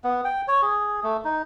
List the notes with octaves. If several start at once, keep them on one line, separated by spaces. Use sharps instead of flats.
B3
G5
C#5
G#4
A3
D#4